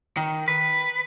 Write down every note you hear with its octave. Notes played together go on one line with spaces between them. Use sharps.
D#3
B4